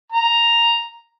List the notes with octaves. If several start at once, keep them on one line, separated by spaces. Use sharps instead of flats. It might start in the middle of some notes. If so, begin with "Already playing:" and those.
A#5